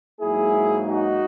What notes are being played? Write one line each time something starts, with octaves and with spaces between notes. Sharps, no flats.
G#2 F#3 A#3 E4 G#4
D#4 F#4